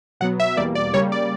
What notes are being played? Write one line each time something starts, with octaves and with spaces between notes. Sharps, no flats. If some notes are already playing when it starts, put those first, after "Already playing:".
B2 F#3 B3 F#5
E5
E2 B2 G3 A#3 D5
D5
C#3 G3 A#3 C#5
D5